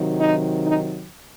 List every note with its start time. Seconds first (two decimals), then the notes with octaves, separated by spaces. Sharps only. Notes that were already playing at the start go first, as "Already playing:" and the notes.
Already playing: C3 D#3 F#3
0.19 D#4
0.63 D#4